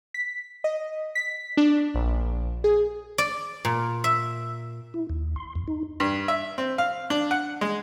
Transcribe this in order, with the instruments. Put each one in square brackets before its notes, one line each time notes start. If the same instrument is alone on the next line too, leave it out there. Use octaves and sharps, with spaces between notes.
[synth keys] B6
D#5
B6
D4
A#1
G#4
[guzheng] D5
A#2
E5
[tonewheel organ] E4
D#2
C6
F2
D#4
[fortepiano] G2
E5
C4
F5
D4
F#5
G#3